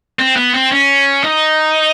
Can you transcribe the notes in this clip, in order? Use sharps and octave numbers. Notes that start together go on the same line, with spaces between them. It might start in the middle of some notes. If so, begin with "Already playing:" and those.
C4
B3
C4
C#4
D#4